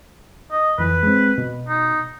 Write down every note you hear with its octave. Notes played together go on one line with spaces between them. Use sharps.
D#5
F2 E3 B4
G#3 C4
B2
D#4